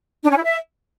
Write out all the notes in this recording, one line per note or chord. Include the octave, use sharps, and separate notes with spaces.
D4
C#4
E4
E5